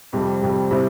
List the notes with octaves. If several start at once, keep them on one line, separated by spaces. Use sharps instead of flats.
F2 C3 G3
F2 C3 G3
C3 G3 C4 E4